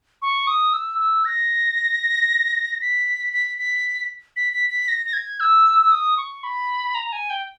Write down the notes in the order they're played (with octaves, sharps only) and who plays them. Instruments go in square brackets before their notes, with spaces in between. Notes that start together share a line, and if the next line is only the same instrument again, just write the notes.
[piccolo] C#6
D#6
E6
E6
A#6
B6
B6
B6
B6
B6
B6
A#6
A#6
G#6
E6
E6
D#6
C#6
B5
A#5
G#5
G5